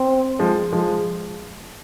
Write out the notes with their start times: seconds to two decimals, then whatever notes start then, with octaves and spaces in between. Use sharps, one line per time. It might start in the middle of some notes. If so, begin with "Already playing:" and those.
Already playing: C4
0.39 F3 G#3
0.72 F3 G#3